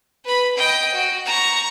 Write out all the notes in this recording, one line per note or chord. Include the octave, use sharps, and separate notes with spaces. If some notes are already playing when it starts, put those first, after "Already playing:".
B4 B5
D#5 G5
F#4
A#5 C#6